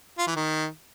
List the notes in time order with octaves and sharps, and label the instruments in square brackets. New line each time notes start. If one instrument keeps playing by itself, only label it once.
[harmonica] F4
E3
D#3